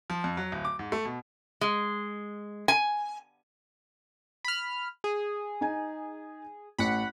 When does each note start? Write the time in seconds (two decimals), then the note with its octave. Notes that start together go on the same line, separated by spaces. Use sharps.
0.10 F3
0.24 F2
0.37 F#3
0.52 D1
0.65 D6
0.79 G#2
0.92 A3
1.05 B2
1.61 G#3
2.68 G#5
4.45 B5 F6
5.04 G#4
5.61 D#4 G#5
6.78 A1 F#5 B5